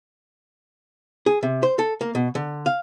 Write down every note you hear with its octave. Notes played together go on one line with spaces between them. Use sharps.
G#4
C3
C5
A4
A#3
B2
D3
F5